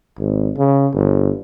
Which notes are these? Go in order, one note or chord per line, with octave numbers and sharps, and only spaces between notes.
G#1
C#3
G1